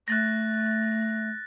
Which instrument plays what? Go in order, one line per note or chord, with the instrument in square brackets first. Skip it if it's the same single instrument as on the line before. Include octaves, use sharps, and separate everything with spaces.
[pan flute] A3 [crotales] F#6 A6 A#6